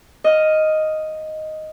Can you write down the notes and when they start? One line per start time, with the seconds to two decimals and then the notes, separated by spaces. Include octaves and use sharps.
0.24 D#5 F5